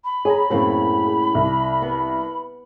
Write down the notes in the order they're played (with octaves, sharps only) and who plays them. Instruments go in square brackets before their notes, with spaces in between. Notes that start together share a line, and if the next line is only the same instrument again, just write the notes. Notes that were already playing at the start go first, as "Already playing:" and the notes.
[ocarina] B5
[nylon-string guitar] G#4 [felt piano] C#5 G#5 A#5
[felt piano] F#2 C4 [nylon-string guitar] A2 C#3 A#3
[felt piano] G#4
C2
[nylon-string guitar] B3